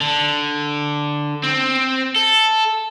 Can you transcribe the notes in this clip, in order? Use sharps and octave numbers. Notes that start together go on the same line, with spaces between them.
D3
C4
A4